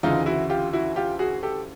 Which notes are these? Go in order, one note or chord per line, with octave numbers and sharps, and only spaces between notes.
D2 C#3 E3 D#4 F4
E4 F#4
F4 G4
E4 F#4
F4 G4
F#4 G#4
G4 A4